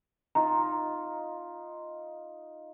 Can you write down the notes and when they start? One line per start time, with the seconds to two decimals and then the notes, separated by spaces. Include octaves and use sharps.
0.35 D#4 F4 A#5